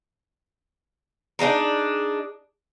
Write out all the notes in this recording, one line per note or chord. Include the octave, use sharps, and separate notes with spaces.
D4 D#4 G#4 A#4